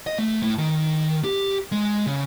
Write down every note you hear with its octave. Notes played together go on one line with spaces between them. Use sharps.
D#5
A3
A2
D#3
G4
G#3
C#3